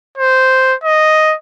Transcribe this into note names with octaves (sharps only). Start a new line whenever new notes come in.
C5
D#5